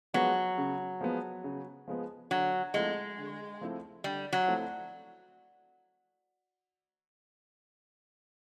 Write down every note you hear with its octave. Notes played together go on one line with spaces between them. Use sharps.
F3 F#3 G#3 B3
C#3
F3 G#3 B3
C#3
F3 G#3 B3
D3 F#3
F3 G#3 A3 C4 E4
D3
F3 A3 C4 E4
D3 G3
F#3
F3 A3 C4 E4